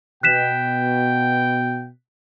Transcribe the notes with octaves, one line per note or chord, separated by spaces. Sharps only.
B2 G5 F#6 B6 E7